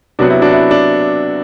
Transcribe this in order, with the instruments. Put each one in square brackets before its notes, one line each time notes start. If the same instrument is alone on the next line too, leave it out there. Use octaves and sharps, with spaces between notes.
[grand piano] C3 F#3 B3 D4 F#4
E4
D4 F#4
E4
D4